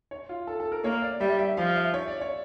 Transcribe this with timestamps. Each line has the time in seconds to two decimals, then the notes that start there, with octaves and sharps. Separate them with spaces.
0.11 C#5
0.29 F4
0.47 A4
0.60 A4
0.72 A#4
0.84 A#3 C#5
1.02 D5
1.21 G3 E5
1.39 E5
1.57 F3 F5
1.76 E5
1.94 C#5
2.08 D5
2.21 C#5